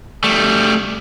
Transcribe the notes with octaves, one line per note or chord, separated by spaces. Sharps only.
G3 A3